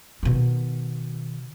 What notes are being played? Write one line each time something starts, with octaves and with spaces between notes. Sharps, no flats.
B2 D#3